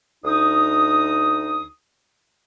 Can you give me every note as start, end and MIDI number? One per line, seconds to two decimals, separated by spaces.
0.24 1.66 38
0.24 1.66 63
0.24 1.66 87